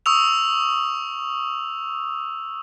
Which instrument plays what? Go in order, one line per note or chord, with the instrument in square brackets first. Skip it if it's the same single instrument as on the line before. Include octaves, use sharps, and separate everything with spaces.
[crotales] C#6 D#6 E6 F7